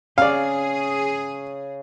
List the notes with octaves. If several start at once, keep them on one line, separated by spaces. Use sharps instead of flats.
C#3 G#4 D5 F5